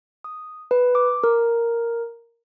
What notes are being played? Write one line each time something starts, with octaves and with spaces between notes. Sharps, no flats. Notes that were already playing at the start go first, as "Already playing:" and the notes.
D#6
B4
D6
A#4